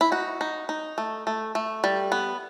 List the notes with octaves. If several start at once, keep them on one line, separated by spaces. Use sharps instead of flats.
E4
D#4 F#4
D#4
D#4
A3
A3
A3
G3
B3